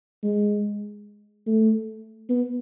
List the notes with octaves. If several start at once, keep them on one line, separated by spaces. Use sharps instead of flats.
G#3
A3
B3